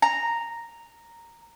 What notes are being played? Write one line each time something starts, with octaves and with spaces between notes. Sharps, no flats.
A#5